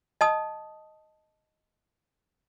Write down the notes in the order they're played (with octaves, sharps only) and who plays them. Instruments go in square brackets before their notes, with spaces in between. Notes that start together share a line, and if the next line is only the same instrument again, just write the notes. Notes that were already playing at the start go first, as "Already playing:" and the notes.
[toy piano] D#5 A5 D#6